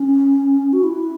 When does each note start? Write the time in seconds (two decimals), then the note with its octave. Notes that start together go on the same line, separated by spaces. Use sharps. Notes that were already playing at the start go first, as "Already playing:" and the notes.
Already playing: C#4
0.73 F#4
0.84 E4